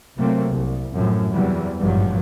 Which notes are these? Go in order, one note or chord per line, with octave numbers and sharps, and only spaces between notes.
C3 F#3 A3 A#3 C4
C2
F#2 A2 F3
E2 C3 E3 F#3 G3
G#1 G2 A#2 F3 F#3